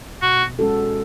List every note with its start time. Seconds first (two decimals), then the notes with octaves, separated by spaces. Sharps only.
0.22 B2 F#4
0.59 G#3 C#4 F#4 A4